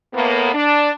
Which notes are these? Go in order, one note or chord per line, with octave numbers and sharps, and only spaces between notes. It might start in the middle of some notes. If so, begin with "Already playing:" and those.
A2 A#3 B3
D4